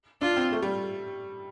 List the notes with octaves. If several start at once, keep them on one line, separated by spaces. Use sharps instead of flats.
D4 F4
C4
A3
G3